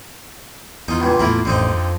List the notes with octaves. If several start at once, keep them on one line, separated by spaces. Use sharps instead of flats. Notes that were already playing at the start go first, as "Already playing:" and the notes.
E2 D#4 F4
C#2 G2 A#2
E2 A2 A#3 E4 F4
A1 F2 D3 C4 D#4
F2